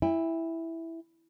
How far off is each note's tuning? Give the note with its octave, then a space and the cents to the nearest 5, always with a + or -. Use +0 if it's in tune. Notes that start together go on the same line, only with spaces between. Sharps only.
E4 +0 G5 +40